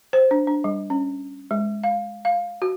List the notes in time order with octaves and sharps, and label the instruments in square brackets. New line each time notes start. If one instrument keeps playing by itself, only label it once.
[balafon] C5
D4
D4
G3
C#4
G#3
F5
F5
F#4